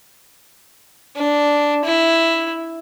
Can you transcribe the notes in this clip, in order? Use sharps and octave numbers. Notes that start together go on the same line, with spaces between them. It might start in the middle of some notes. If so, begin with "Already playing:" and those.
D4
E4